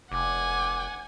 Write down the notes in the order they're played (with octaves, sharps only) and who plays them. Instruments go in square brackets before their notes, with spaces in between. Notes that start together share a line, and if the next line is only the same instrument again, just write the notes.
[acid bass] F1 [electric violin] F#5 G#5 [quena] D6